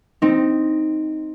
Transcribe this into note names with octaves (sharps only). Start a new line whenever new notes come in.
C4 D#4